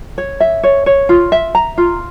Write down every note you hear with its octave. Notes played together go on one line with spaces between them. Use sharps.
C#5
E5
C#5
C#5
F4
E5
A#5
F4